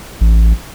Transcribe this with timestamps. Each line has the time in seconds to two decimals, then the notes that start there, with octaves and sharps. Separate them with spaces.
0.21 A1